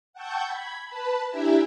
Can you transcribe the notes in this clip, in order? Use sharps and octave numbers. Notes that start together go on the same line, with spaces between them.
F#5 G5 A5 C#6 E6 G6
B5 G#6
B4 A5 B5
D4 E4 G4 E5 G#5 A#5